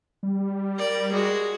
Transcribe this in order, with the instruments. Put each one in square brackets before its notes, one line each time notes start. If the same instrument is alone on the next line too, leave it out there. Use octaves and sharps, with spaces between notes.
[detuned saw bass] G3
[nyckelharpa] A#4 D5
G#3 F#4